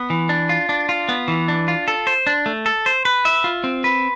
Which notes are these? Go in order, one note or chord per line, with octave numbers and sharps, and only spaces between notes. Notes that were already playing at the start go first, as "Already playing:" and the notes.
Already playing: B3
E3
D4
F4
D4
F4
B3
E3
D4
F4
A4
C5
D4
A3
A4
C5
B4
E5
F4
C4
B4